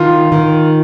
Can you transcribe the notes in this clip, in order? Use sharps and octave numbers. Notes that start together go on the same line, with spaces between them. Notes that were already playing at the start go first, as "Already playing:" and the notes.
Already playing: D#3 F4
D#3